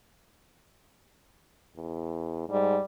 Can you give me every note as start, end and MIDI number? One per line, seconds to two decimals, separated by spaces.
1.76 2.44 40
2.49 2.77 44
2.49 2.83 55